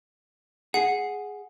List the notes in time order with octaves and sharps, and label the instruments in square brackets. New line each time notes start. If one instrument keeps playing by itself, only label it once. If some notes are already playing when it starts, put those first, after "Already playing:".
[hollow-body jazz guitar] G#4 [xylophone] F#5 C7